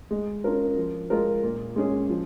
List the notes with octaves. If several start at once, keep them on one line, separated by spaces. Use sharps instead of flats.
G#3
C#4 F4 A#4
F3
G#3 F4 A#4
A#2
G#3 C#4 G#4
F3